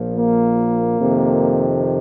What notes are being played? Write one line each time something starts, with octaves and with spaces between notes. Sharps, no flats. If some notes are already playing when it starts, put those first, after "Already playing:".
Already playing: A#1 A#2 F3
A#3
F2 C3 D#3